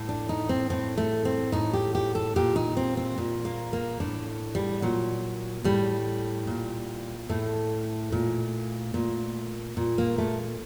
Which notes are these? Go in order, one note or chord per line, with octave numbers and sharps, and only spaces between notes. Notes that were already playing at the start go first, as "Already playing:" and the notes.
Already playing: A2
D4
D#4
C4
A2 C4
A3
C4
A2 D#4
G4
G4
A4
A#2 G4
D#4
C4
C4
A#2
A#3
A#3
A2 D4
G3
A#2 F#3
A2 G3
A#2
A2 A3
A#2
A#2
A#2
A#3
A3